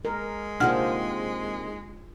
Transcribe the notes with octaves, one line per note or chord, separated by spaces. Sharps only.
G#3 A#4
C3 D#3 A#3 D4 F4 G#4 F#5 F6